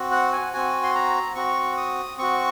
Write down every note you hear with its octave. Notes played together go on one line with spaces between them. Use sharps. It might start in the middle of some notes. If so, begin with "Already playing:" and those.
Already playing: C4 F#4
F#5
G#5
C4 F#4 G#5
C6
A#5
C4 F#4 C#6
D#6
C4 F#4 C#6